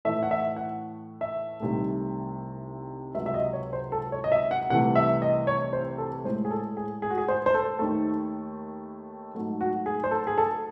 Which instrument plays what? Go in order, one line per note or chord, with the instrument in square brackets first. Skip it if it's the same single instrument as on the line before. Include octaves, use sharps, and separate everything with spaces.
[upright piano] A2 E3 A3 E5
F#5
E5
F#5
E5
C2 C3 D#3 A3
C#2 C3 F#3 E5
E5
D#5
C#5
C5
A4
C#5
D#5
E5
F#5
C2 C3 E3 A3 F#5
E5
D#5
C#5
C5
A4
A2 G#3 C5
G#4
A4
G#4
G#4
F#4
G#4
C5
C5
A4
D#2 D#3 A3
G#2 F#3 A3
F#4
G#4
C5
A4
G#4
A4